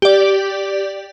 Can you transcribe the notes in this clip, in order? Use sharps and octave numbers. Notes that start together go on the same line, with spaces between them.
G4 D5